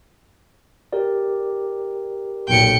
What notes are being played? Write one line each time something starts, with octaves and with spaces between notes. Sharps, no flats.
G4 A#4 D5
B1 A#2 G5 C#7